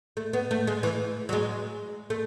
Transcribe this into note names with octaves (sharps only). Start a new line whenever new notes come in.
A3
B3
A3
G#3
E3
F#3
G#3
A3